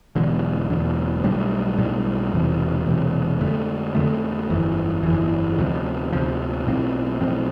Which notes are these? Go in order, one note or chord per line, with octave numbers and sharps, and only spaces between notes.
E1 E2 D3
E1 E2 D3
B1 A2 G3 D4
B1 A2 G3 D4
E1 E2 C3
E1 E2 C3
F2 D3 A3
F2 D3 A3
G1 F2 E3
G1 F2 E3
D2 C3 F3
D2 C3 F3
B1 A2 F3 C4
B1 A2 F3 C4